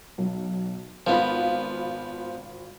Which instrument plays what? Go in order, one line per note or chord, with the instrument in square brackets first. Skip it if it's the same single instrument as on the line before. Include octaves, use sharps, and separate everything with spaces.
[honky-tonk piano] B1
[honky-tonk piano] G#1 F4 B5 [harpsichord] F3 B3